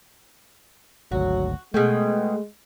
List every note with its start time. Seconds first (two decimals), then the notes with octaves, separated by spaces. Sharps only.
1.12 G#1 D2 F#3 F#4
1.74 B2 G#3 A3 G#4 G5